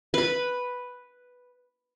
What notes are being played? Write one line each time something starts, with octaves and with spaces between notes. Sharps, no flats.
B4 B5